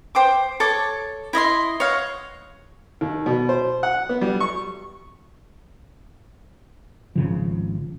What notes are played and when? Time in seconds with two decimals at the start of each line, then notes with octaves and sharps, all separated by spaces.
0.15 C5 G5 D6
0.60 A4 C#5 D6
1.33 E4 D#5 E5 C6
1.80 C#5 D#5 F5 F#5
3.01 D#2
3.26 B2
3.49 C5
3.83 F#5
4.09 B3
4.21 G3
4.40 C#6
7.16 G#1 C#3 F3